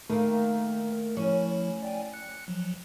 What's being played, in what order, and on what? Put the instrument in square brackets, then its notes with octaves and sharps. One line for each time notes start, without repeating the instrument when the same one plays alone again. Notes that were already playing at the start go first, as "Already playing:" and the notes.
[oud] D#3 A#3 [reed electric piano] A3
[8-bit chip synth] A#4
[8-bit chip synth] F3 E4 [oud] C#4
[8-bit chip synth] D5 G5 G#5
F#6 C#7
F3 F#3